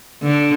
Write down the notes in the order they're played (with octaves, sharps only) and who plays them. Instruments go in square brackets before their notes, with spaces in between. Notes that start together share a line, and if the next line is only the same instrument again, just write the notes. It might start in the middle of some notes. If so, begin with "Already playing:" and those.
[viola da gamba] D3